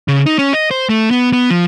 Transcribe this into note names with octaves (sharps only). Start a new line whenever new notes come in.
C#3
D#4
C#4
D#5
C5
A3
B3
B3
F3